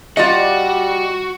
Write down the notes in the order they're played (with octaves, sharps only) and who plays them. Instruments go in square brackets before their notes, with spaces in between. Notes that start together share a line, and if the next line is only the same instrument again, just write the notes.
[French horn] G3 [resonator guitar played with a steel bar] F4 D5 D#5 [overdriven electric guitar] F#4